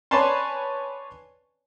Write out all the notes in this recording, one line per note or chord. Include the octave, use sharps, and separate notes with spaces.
B4 C#5 D5 G#5 A5 C6